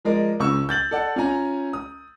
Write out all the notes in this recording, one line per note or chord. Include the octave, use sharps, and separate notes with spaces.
F3 G#3 A#4 D5
C#2 C#3 C#6 E6
G6 A6 F#7
A4 D5 F#5
C#4 F4 G#5 A#5
D#6